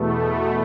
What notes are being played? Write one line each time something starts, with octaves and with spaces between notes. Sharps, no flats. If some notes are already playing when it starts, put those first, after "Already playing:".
Already playing: E2 B2 A3